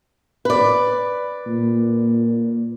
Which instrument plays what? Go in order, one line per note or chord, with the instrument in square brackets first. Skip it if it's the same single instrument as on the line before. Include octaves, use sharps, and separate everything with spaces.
[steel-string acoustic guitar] B4 D5
[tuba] A#2